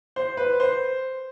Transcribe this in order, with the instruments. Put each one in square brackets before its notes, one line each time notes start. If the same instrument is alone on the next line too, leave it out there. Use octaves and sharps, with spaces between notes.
[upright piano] C5
B4
C5